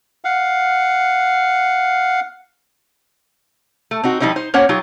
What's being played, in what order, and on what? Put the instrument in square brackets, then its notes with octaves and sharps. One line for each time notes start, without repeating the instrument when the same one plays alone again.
[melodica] F5 F#5
[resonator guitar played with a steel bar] A3
C4 D#4 F#4
F3 G3 D#4 E4 C5
D#4 C5
A#3 C#4 C5 C#5 F#5
F#3 D#4 F4 G4